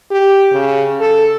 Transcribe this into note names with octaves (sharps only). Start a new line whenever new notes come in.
G4
C#3
A4